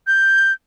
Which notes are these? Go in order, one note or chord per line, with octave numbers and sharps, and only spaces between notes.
G6